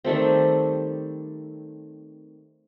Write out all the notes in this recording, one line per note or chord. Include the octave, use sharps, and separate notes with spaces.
D#3 G3 A3 C4